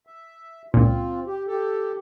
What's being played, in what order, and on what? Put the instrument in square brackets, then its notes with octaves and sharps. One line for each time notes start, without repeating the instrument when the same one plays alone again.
[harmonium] E5
[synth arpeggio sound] C#2 A#2 [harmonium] C4 F4
[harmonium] G4
G4 A4